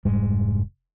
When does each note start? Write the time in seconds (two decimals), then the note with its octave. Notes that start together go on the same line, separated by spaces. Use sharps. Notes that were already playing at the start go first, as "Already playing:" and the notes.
0.05 F1 G#2 G3 G#3